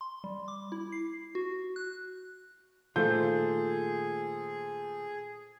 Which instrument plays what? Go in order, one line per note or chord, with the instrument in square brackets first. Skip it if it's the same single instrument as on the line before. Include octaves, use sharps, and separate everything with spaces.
[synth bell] C6
G3
D6
E4
C7
F#4
F#6
[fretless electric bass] A#2 D#3 A3 [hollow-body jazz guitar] F4 [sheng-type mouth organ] G#4 [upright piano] A4 C5 G6